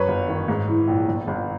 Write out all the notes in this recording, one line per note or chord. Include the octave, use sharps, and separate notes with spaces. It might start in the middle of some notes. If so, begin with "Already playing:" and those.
Already playing: F#2 B4 C#5
G1
D#3
G#2
E3
A#1
G1
G1